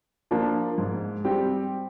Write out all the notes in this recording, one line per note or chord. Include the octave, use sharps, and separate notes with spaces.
F3 A#3 D4
G#2
G3 C4 G4